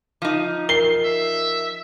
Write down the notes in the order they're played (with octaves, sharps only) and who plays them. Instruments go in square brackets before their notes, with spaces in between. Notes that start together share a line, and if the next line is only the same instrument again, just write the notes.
[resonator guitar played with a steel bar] F3 D#4
[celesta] A#4 [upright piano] C7 G7
[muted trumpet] E5